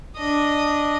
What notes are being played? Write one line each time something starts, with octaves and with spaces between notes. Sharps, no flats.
D4 D#5